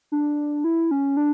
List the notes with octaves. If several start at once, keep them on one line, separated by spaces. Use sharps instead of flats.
D4
E4
C#4
D4